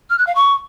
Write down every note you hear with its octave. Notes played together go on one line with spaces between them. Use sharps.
F6
F#6
F5
C#6